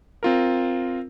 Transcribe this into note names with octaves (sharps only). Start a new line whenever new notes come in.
C4 F4 A#4